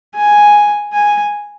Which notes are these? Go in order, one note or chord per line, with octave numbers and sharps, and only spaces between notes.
G#5
G#5